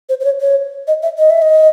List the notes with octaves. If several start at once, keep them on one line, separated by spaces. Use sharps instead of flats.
C5
C5
C#5
C#5
D#5
E5
D#5
E5
D#5